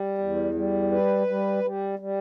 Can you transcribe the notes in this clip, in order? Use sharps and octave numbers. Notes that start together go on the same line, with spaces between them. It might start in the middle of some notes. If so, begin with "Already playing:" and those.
Already playing: G3
E2
G3
B4
G3
G3
G3